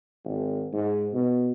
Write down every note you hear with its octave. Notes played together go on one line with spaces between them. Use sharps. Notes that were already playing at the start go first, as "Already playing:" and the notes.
G#1
G#2
B2